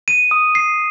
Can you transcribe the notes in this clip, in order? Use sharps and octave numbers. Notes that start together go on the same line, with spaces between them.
D#7
D#6
C7